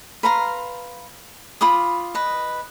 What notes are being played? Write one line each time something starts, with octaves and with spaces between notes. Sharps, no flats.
B4 F5 A#5 C6
F4 B5 D6 D#6
B4 D#5